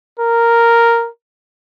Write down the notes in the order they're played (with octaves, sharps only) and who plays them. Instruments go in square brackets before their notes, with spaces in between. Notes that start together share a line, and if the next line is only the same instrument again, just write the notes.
[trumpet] A#4